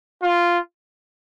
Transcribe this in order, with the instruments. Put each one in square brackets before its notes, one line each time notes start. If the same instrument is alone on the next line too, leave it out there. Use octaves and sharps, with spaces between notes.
[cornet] F4